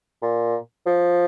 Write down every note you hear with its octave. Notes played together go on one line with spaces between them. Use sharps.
A#2
F3